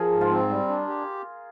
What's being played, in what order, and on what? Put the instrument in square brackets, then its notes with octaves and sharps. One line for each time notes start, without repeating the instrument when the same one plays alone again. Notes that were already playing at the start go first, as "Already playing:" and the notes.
Already playing: [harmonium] F3 [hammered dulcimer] G#4 A#4
[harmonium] G#2
[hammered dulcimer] F4
[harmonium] C4
G3
D4
G4